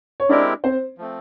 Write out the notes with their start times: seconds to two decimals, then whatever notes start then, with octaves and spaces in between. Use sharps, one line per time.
0.20 C#5
0.29 G#3 C4 D4 E4 G4 A#4 D5
0.64 C4 C5
0.98 F3 A3 C4